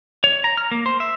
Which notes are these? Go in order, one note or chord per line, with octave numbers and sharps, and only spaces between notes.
C#5
A#5
F6
A#3
C5
E5